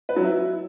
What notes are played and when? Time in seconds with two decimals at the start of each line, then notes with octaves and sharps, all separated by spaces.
0.09 B4
0.16 F#3
0.24 E4